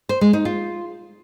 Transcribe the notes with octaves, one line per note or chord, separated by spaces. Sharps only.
C5
G#3
D#4
F4